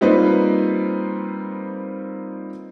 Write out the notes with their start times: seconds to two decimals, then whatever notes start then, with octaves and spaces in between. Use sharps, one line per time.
0.01 G3 A#3 C4 D#4 F4 B4